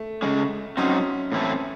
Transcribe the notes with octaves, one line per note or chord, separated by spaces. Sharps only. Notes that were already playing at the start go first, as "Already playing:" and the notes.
Already playing: A3
C#3 G#3 C#4
F#3 C4 C#4 D#4
A2 E3 C4 E4 A4